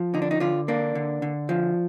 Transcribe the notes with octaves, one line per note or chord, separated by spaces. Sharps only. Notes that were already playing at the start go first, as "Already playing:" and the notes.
Already playing: F3
D3 D#4
D4
D#4
D3 F4
A#3 D4
D3
D3
F3